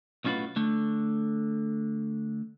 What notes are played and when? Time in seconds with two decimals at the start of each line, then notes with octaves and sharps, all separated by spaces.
0.24 B1 A2 C#4 F4 F#4 B4
0.56 D3 A3